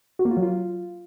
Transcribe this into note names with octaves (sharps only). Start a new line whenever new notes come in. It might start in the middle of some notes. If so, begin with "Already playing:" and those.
F#4
A#3
F4
F#3
F4